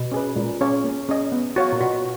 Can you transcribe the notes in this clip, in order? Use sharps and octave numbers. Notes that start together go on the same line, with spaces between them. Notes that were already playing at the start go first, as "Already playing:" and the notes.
Already playing: B2
C#4 G#4 B4
A#2 G#3
C#4 G#4 C#5 F5
A#3
C#4 G#4 D#5
B3
F#4 C#5 F5
A#2
B2 F#4